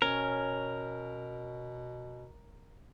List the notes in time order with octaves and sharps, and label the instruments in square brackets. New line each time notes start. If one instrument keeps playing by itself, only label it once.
[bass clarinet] B2 [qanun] C#4 [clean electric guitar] A#4